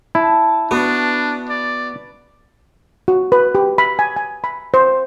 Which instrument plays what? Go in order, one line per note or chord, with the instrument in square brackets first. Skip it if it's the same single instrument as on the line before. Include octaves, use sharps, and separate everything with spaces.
[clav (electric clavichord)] E4 [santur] A5
[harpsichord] B3 F#4 [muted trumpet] D4 [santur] B4
[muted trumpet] D5
[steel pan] F#4
B4
G4
B5
G#5
G#5
B5
C5